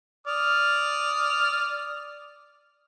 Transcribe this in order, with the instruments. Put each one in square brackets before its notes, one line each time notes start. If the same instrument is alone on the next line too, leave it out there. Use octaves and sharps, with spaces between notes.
[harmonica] D5 D#6 F6